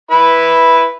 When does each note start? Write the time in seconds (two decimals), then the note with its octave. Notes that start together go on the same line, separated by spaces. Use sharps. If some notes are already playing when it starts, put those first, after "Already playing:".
0.11 E4 B4 B5